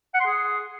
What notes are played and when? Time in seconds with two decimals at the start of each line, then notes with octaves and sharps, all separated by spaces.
0.14 F#5
0.20 C6
0.26 G#4